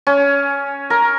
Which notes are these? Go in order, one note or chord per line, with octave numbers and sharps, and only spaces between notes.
C#4
A#4